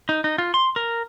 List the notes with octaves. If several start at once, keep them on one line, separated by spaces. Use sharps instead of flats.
D#4
D#4
F4
C6
A#4